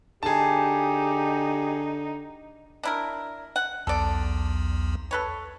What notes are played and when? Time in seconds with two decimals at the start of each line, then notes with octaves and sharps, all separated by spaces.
0.23 D3 D#4 G4 G#4 A5
2.83 D4 E4 A#4
3.56 F#5
3.87 B1 E2 A4 D5
5.11 A4 B4 C#5